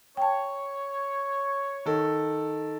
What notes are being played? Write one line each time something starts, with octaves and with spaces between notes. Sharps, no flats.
C#5 G5 A5
D#3 A4